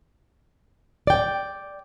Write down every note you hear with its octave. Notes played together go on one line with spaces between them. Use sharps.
D5 G5